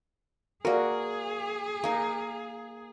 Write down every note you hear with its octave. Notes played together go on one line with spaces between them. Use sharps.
A#3 F#4 G#4 A#4 D5
A#3 D#4